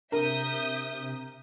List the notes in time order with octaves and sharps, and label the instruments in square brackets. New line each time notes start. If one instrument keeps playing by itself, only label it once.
[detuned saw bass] C3 [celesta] D4 [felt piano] A#4 [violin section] E5 D#6 G6